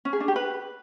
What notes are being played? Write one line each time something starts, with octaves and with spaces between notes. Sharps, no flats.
C#4
G#4
D4
G4
B4